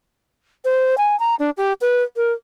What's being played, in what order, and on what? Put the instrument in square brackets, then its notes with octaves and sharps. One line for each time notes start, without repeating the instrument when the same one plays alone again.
[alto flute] C5
G#5
A#5
D4
G4
B4
A#4